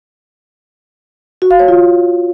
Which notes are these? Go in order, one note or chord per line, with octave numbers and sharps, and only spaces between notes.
F#4
F5
C#5
F4